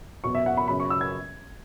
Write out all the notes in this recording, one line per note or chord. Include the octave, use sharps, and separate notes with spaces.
E2 B2 F#3 B3 C#6
E5
F#5
B5
F#2 C#3 F#3 B5
C#6
E6
G#6